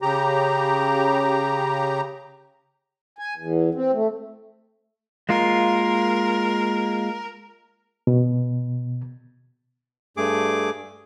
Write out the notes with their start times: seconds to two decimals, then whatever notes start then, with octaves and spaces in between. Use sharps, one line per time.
0.02 C#3 G4 A#5
3.18 G#5
3.36 E2
3.75 C4
3.93 A3
5.29 G#3 A#3 F4 A#4
8.07 B2
10.17 G2 A3 G#4 D6